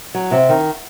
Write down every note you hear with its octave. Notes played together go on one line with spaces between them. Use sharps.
F#3
C3
D#3